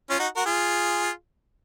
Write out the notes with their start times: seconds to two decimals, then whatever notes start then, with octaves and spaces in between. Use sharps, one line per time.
0.10 C#4 F4
0.19 D#4 F#4
0.36 F#4 A#4
0.45 F4 G#4